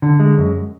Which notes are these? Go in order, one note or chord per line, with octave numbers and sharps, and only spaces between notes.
D3
G#3
F#2